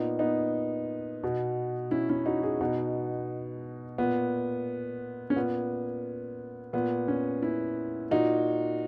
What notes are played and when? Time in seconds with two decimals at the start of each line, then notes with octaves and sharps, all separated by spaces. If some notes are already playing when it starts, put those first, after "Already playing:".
Already playing: A#2 B3 D#4
0.19 B3 D#4
1.23 B2
1.91 C#4 E4
2.09 C#4 E4
2.26 D#4 F#4
2.43 E4 G#4
2.61 B2 B3 D#4
3.98 A#2 B3
5.30 C#4
5.36 A#2 B3
6.73 A#2 B3
7.08 C#4
7.42 C#4 E4
8.11 A#2 D#4 F#4